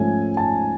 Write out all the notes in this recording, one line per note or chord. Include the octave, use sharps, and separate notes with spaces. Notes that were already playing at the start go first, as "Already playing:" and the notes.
Already playing: G#2 F3 A3 C#4 G#5
A5